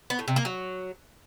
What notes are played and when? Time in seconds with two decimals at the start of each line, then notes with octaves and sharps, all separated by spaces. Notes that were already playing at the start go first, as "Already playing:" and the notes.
0.10 B3
0.19 A2
0.28 C3
0.36 A#3
0.45 F#3